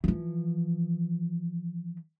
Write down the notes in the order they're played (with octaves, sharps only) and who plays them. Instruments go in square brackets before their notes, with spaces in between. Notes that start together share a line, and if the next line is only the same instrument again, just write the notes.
[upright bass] E3 F3